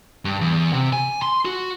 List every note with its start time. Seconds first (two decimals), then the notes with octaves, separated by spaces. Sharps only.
0.25 G2
0.41 E2
0.73 C3
0.93 G#5
1.22 C6
1.45 F#4